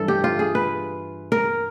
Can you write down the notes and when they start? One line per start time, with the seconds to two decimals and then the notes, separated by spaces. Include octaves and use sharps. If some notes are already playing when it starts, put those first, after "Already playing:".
Already playing: G2 E3 A4
0.08 G4
0.24 F4
0.39 G#4
0.55 B4
1.32 A#4